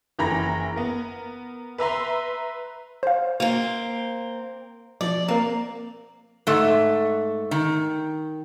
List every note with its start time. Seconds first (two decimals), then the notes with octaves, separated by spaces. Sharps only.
0.19 F#1 E3 A#5 B5 A#6
0.76 B3 A#4
1.78 B4 E5 A#5 C6
3.03 C5 F5
3.40 A#3 C4
5.01 F3 D5
5.28 A#3 C4 A#4
6.47 G#2 A3
7.51 D#3